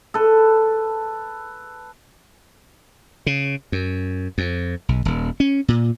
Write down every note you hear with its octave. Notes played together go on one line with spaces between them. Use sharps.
A4 B4
C#3
F#2
F2
B1
D#1
C#4
A#2